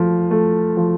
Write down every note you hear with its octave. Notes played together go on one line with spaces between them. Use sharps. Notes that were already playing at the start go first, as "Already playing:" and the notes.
Already playing: F3 A3
A3
F3